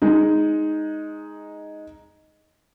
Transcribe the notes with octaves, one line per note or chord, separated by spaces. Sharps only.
G#3 D#4